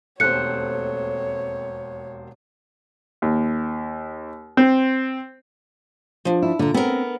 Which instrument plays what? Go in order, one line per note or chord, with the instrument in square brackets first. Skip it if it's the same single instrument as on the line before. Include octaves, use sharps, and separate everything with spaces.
[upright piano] E1 D#2 C5 [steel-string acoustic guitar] A3 C4 [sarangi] C#5 [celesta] F#6 C#7
[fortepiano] D#2
C4
[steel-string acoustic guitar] F3 D4
[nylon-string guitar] E4
[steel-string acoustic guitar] A#2 A#5 [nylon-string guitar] D3
[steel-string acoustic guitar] B3 A#4 [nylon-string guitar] C4